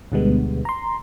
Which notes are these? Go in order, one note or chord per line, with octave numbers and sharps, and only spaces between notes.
D2 B2 D3 G3 G#3 B3
A#5 C6